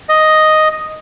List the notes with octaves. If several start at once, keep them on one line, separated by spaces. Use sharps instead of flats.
D#5